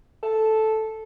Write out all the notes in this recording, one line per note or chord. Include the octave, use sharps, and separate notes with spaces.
A4